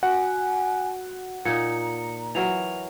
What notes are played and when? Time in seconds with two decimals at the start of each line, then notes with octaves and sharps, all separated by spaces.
0.03 F#4 F#5 G#5
1.45 A#2 D#4 A#5 C#7
2.35 E3 F#3 A#4 F7